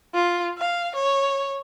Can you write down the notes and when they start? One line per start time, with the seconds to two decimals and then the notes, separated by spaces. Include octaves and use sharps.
0.14 F4
0.58 F5
0.95 C#5